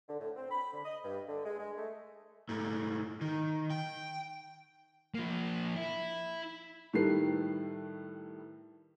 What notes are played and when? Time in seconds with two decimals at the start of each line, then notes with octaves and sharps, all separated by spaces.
0.09 D3
0.20 A2
0.36 C4
0.51 B5
0.73 D3
0.85 D#5
1.04 G2
1.29 D3
1.46 G#3
1.59 G#3
1.77 A3
2.49 G#2 A3
3.21 D#3
3.70 G5
5.15 F3 A#3
5.76 E4
6.93 A2 D#3 G3 A4 B4 C7